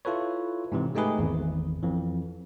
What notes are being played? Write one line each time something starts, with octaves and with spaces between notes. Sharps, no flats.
E4 F4 A4 B4 C#5
G#2 C3 E3
G#3 A3 D#4 G4 G#4 B4
G#1 E2
F2 E3